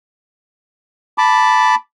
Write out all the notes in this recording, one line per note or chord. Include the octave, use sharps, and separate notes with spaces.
A5 B5 D6